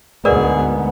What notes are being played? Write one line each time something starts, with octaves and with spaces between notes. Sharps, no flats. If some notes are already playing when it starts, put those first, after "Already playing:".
D2 G#2 B3 G#4 A#4 B4 D5